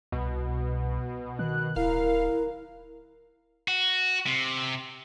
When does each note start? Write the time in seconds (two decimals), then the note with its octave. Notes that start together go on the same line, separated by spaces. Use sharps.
0.12 C2 B2
1.39 D#3 F#6
1.76 D1 E4 A#4 F5
3.68 F#4
4.26 C3